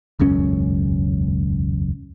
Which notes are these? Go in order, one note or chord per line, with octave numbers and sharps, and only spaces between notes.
E1 C#2 F#2 C#4